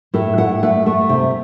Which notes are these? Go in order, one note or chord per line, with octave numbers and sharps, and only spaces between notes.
A2 A4
A2 F#5
A3 F#5
A3
C3